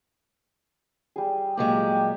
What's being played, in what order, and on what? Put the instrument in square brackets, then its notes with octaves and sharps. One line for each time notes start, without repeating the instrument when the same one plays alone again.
[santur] G3 G#4
[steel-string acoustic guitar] A#2 F#3 G#3 [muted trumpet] G4